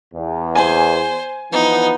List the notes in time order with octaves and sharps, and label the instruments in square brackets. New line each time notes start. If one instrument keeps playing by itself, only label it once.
[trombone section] E2
[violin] C5 [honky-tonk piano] G#5
[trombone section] E3 F3 B3 [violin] D#4